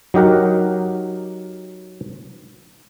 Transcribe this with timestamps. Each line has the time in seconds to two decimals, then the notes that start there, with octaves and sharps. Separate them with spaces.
0.14 F#3 D#4 G4 A#4 F#5